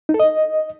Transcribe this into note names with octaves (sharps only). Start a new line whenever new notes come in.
D#4
A4
D#5